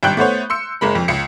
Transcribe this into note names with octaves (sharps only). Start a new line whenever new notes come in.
G#1 G2 G5 F#6 G6
A3 B3 C5 C#5
C6 E6 C#7
F#1 G#3 A#4 B5
F2
C#2 C7 C#7